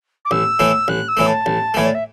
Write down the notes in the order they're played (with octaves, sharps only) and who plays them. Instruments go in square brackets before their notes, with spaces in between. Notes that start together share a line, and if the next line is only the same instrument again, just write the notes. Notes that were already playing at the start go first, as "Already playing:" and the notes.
[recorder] D6
[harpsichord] A1 [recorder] E6
[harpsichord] A2 E3 A3
[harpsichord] A1 [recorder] F#6
[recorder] E6
[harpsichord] A2 E3 A3
[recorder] A5
[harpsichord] A1
[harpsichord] A2 E3 A3 [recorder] C#5
[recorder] D5
E5